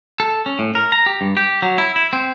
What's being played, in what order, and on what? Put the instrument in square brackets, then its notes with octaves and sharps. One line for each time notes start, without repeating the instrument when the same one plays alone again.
[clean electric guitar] A4
C#4
A2
A#4
A#5
G4
G2
G4
F#3
E4
E4
C4